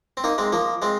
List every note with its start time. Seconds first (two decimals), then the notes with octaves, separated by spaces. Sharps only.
0.17 C4
0.24 A#3 D#4
0.38 G#3 C4
0.52 F3 A#3
0.82 G#3 C4